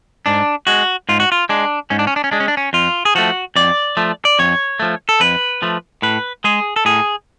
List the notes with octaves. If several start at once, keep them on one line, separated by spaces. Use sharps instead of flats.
G#2 D4
G#3 F#4
G#2 F4
F#4
F4
G#3 D4
G#2 C#4
D4
C#4
D4
C#4
G#3 D4
C#4
D4
C#4
F2 F4
G#4
F3 A3 F#4
F2 D5
F3 A3
D5
F2 C#5
F3 A3
A4
F2 B4
F3 A3
A2 B4
G#3 G#4
A4
A2 G#4